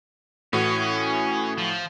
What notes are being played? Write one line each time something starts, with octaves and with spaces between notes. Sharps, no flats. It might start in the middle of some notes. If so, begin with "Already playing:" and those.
A2 E3 C#4 F#4
F3